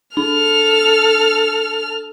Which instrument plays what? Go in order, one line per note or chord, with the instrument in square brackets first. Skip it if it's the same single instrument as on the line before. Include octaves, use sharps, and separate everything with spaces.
[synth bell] D4 [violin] A4 F6